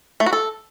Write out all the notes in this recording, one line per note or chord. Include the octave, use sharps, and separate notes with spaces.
A3
F#4
A4